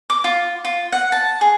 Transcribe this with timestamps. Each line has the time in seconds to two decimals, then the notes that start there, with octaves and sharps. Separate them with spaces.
0.10 D6
0.24 F4
0.65 F4
0.92 F#5
1.12 A5
1.41 G#4